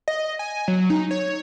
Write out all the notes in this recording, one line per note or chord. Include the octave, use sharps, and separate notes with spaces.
D#5
G#5
F#3
D#4
C#5